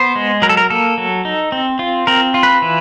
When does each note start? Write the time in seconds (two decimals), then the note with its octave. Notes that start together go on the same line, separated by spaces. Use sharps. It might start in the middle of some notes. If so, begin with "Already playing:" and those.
Already playing: B3 C5
0.16 G#3
0.42 F#3 A#4
0.49 A4
0.57 A#4
0.70 A#3 A4
0.98 F#3
1.25 D#4
1.52 C4
1.79 F4
2.07 C4 A#4
2.34 F4
2.43 B4
2.62 E3